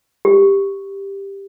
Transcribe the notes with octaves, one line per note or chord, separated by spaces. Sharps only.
G4